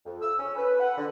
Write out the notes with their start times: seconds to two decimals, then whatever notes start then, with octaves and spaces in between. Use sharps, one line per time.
0.05 F2
0.22 E6
0.39 C#4
0.56 B4
0.80 F#5
0.98 D3